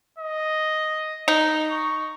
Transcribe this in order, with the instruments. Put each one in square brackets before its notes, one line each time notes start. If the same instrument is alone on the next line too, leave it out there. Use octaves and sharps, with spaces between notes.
[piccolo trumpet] D#5
[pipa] D#4
[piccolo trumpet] C#6